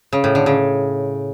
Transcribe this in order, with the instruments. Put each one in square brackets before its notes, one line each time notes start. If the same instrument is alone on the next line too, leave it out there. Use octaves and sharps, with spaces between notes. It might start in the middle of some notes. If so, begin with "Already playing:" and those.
[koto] C#3
A2
D3
C#3